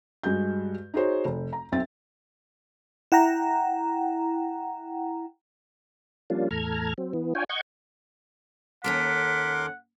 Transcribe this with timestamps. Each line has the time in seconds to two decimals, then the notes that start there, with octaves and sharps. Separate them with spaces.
0.23 G2 G#3 F#4 G6
0.94 D#4 F#4 G#4 C5 C#5
1.25 F1
1.53 A#5
1.72 B1 C4 E5 A6
3.12 E4 F#5 G5 A#5
6.30 F3 G3 A#3 C#4 D4 F4
6.51 E2 A2 A4 A#5 F6 G#6
6.98 F#3 C4
7.14 E3 B3
7.35 D4 F4 C#5 G5 G#5
7.49 D#5 F#5 C#6 G6 G#6
8.84 D#2 C#4 A4 A#4 F#5 C6 D6 B6